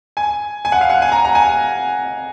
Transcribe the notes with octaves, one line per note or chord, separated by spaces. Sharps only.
G#5
G#5
F#5
F5
F#5
G#5
A#5
A#5
G#5